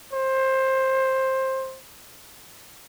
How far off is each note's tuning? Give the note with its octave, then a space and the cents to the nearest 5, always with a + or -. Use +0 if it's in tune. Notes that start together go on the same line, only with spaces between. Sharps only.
C5 +15